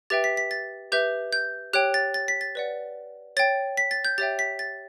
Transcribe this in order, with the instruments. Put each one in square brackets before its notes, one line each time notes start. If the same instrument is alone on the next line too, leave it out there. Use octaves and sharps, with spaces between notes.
[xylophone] G4 B4 E5 G5 A6
B6
B6
A6
G4 B4 E5 G6
G6
G4 C#5 G5 F#6
A6
A6
B6
A6
B4 D5 F#5
C#5 G5 A6
B6
A6
G6
G4 C#5 E5 G5 A6
B6
A6